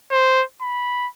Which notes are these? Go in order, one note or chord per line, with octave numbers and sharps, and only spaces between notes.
C5
B5